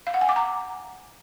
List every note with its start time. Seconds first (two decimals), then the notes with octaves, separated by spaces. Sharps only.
0.07 F5
0.14 F#5
0.21 G#5
0.29 D6
0.36 A#5